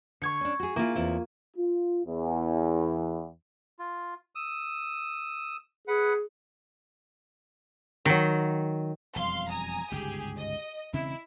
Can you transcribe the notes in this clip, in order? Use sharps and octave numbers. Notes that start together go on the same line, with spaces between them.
D3 C#6 G#6 C#7
C#4 D4
F#4 G#4
A#3 E4 F4 G#4
E2 C4 E4
F4
E2
F4
D#6 E6
G#4 B4 F#5
D#3 F#3
E1 F2 G3 F5 C6
G#5 A#5 D#6
G1 C#2 G#2 G4 G#4
D#5
E1 C#3 C4 E4